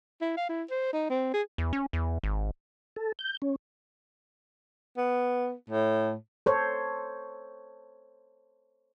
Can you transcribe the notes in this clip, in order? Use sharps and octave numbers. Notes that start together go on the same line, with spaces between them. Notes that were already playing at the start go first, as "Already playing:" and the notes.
E4
F5
E4
C5
D#4
C4
G#4
E2
C#4
E2
G#1
A4
G6
C#4
B3
A2
A4 C5 C#5